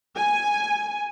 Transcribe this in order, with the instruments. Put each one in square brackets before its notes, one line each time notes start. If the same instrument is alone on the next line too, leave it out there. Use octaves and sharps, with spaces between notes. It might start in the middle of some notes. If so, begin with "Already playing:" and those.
[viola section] G#5